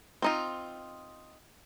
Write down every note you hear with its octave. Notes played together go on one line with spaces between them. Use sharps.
C4 D#4 F4